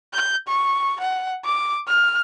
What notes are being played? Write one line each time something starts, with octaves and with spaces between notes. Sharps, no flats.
G6
C#6
F#5
D6
F6